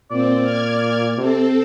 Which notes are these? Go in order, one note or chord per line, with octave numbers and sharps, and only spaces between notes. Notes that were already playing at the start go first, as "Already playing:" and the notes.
A#2 C4 D5
F6 G#6
C3 C4 A4